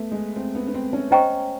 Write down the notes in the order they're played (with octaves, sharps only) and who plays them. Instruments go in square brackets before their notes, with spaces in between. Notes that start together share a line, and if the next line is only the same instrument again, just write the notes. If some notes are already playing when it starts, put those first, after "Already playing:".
Already playing: [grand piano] A3 B3
G#3
C4
B3
B3
C4
C#4
[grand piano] C#4 [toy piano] C5 D#5 G5 A#5 C#6